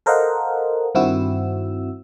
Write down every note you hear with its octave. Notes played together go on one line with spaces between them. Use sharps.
A4 A#4 C5 D#5 F5 F#5
G2 D#3 C4 E4 F#4 E6